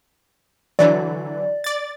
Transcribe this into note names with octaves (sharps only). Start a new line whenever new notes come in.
D3 E3 F#3 D5
D5 A6